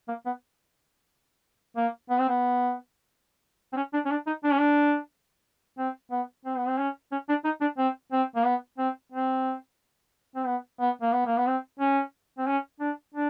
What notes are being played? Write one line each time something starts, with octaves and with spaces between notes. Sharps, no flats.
A#3
B3
A#3
B3
C4
B3
C4
C#4
D4
C#4
D4
D#4
D4
C#4
D4
C4
B3
C4
B3
C4
C#4
C#4
D4
D#4
D4
C4
C4
A#3
B3
C4
C4
C4
B3
B3
A#3
B3
A#3
B3
C4
C#4
C4
C#4
D4
D4